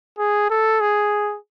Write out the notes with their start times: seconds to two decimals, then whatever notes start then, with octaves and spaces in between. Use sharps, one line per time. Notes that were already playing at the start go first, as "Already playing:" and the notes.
0.18 G#4
0.50 A4
0.81 G#4